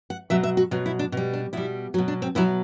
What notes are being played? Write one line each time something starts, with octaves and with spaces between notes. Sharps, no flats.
F#5
B2 F#3 E5
E5
F#4
B2 F#3 F#4
E4
D4
B2 G3
D4
B2 G3 E4
B2 F#3 F#4
D4
C4
B2 F#3 E4